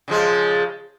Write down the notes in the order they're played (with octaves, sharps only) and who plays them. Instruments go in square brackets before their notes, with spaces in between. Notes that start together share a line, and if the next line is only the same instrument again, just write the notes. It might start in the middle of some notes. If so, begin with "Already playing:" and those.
[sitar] C#3 F3 G#3